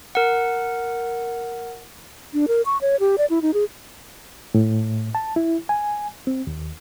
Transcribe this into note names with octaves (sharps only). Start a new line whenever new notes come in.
A#4 F#5
D4
A#4
C#6
C#5
G4
D5
E4
D#4
G#4
A2
A5
E4
G#5
C4
D#2